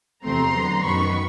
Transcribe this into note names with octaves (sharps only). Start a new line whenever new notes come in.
E2 C3 F3 A3 C4 A#5 C6
D3 F#3 B3
F#2 D#3 F#3 B3 B5 C#6